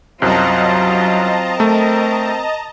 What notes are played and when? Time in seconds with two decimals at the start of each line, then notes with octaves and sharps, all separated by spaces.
0.22 C2 F#2 F#3 C4 F4 D#5 A5 A#5
1.60 A3 A#4